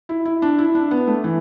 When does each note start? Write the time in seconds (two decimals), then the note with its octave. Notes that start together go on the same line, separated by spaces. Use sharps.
0.09 E4
0.25 E4
0.42 D4
0.58 E4
0.75 D4
0.91 B3
1.07 A3
1.24 E3